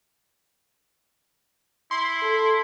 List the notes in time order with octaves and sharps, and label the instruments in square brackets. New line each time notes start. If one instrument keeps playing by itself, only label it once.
[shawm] E4 [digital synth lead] C6
[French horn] A4